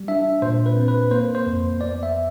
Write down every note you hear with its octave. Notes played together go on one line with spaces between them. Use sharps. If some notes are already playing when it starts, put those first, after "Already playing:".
Already playing: G3
D4 E5
A#2 C5
B4
C4
B4
A#3 C5
C5
F2
B3 D5
E5